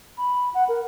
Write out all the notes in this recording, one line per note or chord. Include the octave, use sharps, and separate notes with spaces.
B5
F#5
A#4